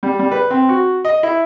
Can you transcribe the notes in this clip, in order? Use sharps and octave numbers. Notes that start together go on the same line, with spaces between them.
G3
G3
B4
C4
F#4
D#5
E4